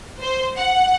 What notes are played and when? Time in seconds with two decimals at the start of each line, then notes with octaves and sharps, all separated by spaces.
0.21 C5
0.56 F#5